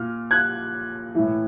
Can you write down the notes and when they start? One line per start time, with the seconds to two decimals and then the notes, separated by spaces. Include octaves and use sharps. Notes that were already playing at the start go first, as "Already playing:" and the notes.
Already playing: A#2 F6
0.31 F#6 G#6
1.15 A2 E3